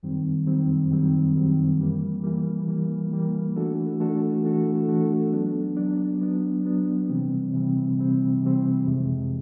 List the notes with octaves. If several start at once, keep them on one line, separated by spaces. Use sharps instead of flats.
F#2 D#3 G3 C4
F#2 D#3 G3 C4
F#2 D#3 G3 C4
F#2 D#3 G3 C4
E3 G3 A#3
E3 G3 A#3
E3 G3 A#3
E3 G3 A#3
E3 A3 D4 F#4 A4
E3 A3 D4 F#4 A4
E3 A3 D4 F#4 A4
E3 A3 D4 F#4 A4
F#3 B3 D4
F#3 B3 D4
F#3 B3 D4
F#3 B3 D4
C3 E3 G3 C4
C3 E3 G3 C4
C3 E3 G3 C4
C3 E3 G3 C4
F2 C3 F3 G#3